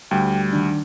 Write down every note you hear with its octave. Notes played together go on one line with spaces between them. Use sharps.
D2 G3 G5
D#3 D4